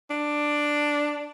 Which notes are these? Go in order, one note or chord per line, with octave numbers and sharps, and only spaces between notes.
D4